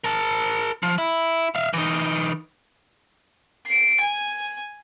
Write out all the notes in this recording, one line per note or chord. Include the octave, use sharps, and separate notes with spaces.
A#4 A5
F3
E4
E5 F5
E3 D#4
C7 D7
G#5